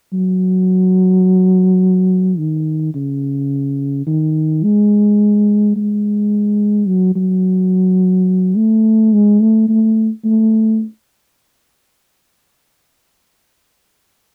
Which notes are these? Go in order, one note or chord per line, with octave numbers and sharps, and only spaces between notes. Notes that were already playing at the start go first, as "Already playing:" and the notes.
F#3
D#3
C#3
D#3
G#3
G#3
F#3
F#3
A3
G#3
A3
A3
A3